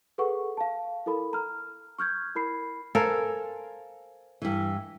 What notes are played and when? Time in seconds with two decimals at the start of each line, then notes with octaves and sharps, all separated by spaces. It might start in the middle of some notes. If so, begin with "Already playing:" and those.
0.18 G#4 A4 B4 F#5 C#6
0.57 F5 A5
1.06 E4 A4 A#4 B5
1.33 A#5 F6
1.98 C#6 F6 G6 G#6
2.35 E4 A#4 B5 C7
2.95 A4 A#4 C5 F5 G#5
4.42 G2 E3